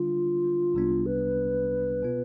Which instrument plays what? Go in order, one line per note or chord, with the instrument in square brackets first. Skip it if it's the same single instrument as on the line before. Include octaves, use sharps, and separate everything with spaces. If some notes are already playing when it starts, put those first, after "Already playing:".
Already playing: [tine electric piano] D3 G3 D4 [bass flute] F4
[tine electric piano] C2 C3 G3 B3 D4
[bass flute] B4
[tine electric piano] B2 B3 F4